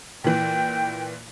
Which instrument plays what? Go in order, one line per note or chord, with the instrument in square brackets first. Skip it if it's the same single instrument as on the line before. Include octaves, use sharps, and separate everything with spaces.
[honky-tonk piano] A#2 E3 [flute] G5